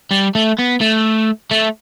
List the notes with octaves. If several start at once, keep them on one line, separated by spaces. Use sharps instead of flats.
G3
A3
B3
A3
A3